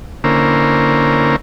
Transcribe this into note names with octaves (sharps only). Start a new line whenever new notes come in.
D3 A#3 C#4 E4 A#4 C5